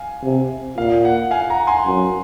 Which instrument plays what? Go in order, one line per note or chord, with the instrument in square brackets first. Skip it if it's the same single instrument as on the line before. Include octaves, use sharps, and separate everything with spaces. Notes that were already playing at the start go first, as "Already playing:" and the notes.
Already playing: [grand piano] F5 G#5
[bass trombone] C3
[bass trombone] A#2 [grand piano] F5
[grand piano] F#5
F5 G#5
F#5 A#5
G#5 C6
[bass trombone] F#2